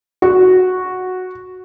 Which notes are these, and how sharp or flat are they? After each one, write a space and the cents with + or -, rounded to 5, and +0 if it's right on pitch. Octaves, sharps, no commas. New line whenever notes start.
F#4 -5